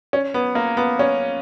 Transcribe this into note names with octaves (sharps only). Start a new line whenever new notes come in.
C#4
B3
A#3
B3
C#4